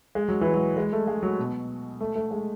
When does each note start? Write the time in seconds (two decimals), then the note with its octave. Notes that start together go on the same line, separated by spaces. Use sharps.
0.15 G#3
0.28 F#3
0.41 E3
0.54 F#3
0.77 G#3
0.93 A3
1.07 G#3
1.23 F#3
1.38 B2
2.01 A3
2.15 A3
2.31 G#3